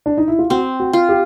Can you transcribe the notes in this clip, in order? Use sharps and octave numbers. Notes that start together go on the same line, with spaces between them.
D4
D#4
E4
F4
C4 F#4
F#4
F4
G4